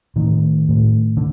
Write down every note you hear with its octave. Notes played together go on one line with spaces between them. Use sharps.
A2 D#3
A2
D3